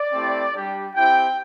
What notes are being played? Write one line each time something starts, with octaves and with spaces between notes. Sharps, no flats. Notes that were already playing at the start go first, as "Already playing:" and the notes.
Already playing: D5
A3 C4 E4 G4
G3 D4 G4
C4 E4 G4 G5